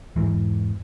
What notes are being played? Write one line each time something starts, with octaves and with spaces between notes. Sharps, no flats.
E2 G#2 E3